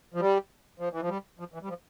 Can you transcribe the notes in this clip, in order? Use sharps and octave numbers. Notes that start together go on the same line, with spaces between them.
F3
G3
F3
E3
F3
G3
F3
E3
G3
F3